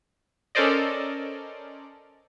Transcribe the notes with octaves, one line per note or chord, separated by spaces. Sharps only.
C#4 A4 A#4 C5 D5 D#5